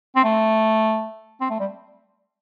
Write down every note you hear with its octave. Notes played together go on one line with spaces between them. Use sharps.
C4
A3
C4
A3
G3